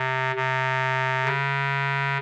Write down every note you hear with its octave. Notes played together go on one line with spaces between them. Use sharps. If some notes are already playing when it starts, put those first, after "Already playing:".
Already playing: C3
C3
C#3